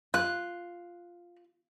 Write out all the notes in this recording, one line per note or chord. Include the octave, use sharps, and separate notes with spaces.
F4 F#6